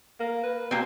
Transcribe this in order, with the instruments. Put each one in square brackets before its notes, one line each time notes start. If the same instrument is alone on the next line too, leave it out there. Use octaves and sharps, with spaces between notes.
[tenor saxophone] A#3
B4
[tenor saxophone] B2 [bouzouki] A#3 C4